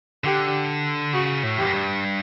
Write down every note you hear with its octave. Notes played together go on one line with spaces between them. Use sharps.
D3 G4
C#3 F#4
A2
E2 G4
F#2
G2